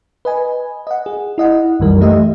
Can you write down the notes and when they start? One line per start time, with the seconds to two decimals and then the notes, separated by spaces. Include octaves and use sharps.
0.25 B4 D#5 G#5
0.87 D#5 F#5
1.06 G#4
1.38 E4 D#5 F#5
1.80 C2 F#2 D#3 E3 G3 A#4
2.01 E3 A3 G4 D#5 E5